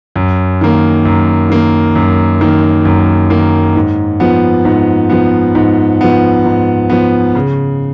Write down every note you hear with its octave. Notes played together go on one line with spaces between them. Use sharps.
F#2
D#3 A#3
F#2
D#3 A#3
F#2
D#3 A#3
F#2
D#3 A#3
G#2
F3 B3
G#2
F3 B3
G#2
F3 B3
G#2
F3 B3
C#3